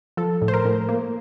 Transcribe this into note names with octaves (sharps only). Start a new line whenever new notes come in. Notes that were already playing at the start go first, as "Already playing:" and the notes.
F3 A4
A2
C5
A#4
A2
A#3